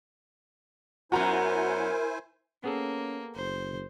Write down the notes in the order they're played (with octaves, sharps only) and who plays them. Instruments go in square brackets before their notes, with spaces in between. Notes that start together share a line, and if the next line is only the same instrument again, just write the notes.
[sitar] F#2 B3 [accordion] E4 C5 G#5 [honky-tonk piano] F#4 A#5 [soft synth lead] A#4
[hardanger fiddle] A#3 [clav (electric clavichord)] B3 G#4 A4 [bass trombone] C#4
[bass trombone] F#1 [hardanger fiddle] C5